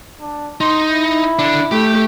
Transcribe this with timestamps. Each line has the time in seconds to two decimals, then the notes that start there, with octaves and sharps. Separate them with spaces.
0.21 D4
0.61 D#4 C6
0.90 E4
1.39 D3 D4
1.71 A3 G4